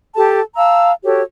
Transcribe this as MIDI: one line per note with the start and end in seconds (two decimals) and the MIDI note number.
0.15 0.41 67
0.15 0.41 69
0.15 0.41 81
0.55 0.91 77
0.55 0.91 81
0.55 0.91 82
0.55 0.91 88
1.04 1.22 66
1.04 1.22 67
1.04 1.22 69
1.04 1.22 73